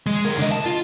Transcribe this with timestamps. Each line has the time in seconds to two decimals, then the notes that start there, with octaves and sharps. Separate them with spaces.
0.06 G#3
0.25 D2 A#4
0.39 D3 D#5
0.52 A5
0.66 F4